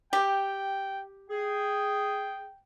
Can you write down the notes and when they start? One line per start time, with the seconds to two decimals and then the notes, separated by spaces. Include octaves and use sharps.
0.13 G4 G5
1.30 G#4 G5